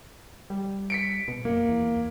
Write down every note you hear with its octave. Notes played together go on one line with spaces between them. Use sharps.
G3
B6 C#7 D7
B2
F#2 A#3
E2